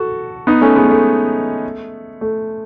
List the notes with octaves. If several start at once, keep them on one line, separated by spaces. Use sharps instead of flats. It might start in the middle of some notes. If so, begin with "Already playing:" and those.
Already playing: F#4 A4
B3 D#4
A3 C#4
G#3 B3
A3
A3